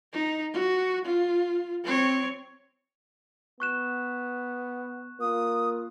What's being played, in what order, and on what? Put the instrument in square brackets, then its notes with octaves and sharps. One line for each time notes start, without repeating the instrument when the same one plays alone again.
[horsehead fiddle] D#4
F#4
F4
C4 C#5
[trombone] B3 [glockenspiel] C#6 F#6 E7
[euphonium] A#3 [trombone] F4 [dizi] D#6